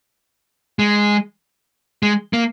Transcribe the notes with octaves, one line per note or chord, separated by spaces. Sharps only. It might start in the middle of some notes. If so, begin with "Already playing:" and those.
G#3
G#3
A#3